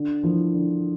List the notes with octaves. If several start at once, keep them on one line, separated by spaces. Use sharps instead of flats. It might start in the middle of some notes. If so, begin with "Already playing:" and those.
Already playing: D3
F3 A#3 E4
D3